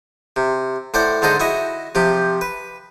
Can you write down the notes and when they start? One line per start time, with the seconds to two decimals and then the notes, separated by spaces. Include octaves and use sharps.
0.36 C3
0.94 A2 C5 D5 F#5
1.22 G#2 D3 A4 C5 D#5
1.40 E4 F#4 D#5
1.95 C3 F3 G4
2.41 B4